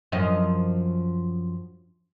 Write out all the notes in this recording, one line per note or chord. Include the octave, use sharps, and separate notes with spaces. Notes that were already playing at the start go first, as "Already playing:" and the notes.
F#2 F3 D#5